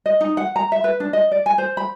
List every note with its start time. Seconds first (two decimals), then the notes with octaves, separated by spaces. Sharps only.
0.06 D#5
0.21 D#4
0.37 F#5
0.56 A#5
0.72 E5
0.84 B4
1.00 D4
1.13 D#5
1.32 D5
1.46 G#5
1.58 C5
1.77 B5